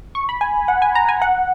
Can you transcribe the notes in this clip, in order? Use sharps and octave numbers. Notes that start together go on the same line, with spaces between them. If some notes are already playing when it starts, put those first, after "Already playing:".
C#6
B5
G#5
F#5
G#5
A#5
G#5
F#5